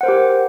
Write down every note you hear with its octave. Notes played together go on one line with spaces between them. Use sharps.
G4 A#4 C5 F#5